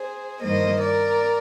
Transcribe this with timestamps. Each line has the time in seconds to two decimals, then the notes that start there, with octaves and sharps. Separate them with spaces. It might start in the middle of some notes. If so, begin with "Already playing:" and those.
Already playing: G#4 C5
0.42 G2 D#3 G3 A#3 C5 D#5
0.80 A#4 D5